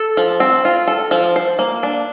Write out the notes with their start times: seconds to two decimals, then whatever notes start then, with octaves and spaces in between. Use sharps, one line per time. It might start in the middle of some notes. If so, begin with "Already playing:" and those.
Already playing: A4
0.17 F3
0.40 C4
0.65 F4
0.87 A4
1.11 F3
1.36 C5
1.59 A#3
1.83 D4